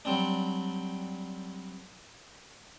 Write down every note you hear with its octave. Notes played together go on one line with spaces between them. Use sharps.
F#3 G3 C4 D4